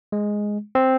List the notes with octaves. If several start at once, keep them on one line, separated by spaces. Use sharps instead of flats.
G#3
C4